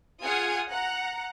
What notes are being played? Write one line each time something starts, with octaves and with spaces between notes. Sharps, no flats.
F4 G#4 F#5 D#6 F6 G#6
F#5 A#5